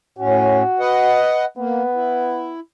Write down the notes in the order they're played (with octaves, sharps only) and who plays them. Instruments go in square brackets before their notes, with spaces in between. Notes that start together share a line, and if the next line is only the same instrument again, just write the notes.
[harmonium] A2 C#4 [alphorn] F#4
[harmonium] B4 D#5 F#5
[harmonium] A#3 [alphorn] B3
[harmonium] E4